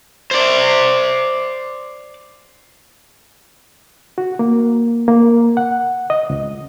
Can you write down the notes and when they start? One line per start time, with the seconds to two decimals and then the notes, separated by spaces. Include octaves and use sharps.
0.31 C5 D5
4.18 F#4
4.39 A#3
5.08 A#3
5.57 F#5
6.10 D#5
6.30 C#2